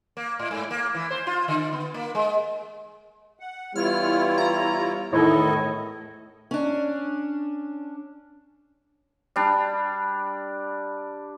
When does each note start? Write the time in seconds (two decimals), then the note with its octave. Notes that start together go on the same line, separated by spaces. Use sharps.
0.17 A#3
0.39 A2
0.51 G#2
0.71 A#3
0.95 E3
1.11 C5
1.27 F4
1.48 D3
1.73 B3
1.94 A#3
2.15 G#3
3.40 F#5
3.75 E3 G3 B3 E4 F4 C#5 F6
4.38 A#5
5.13 E2 A2 D#3 E4 A4 D#5
6.51 C#4 D4
9.36 G3 D4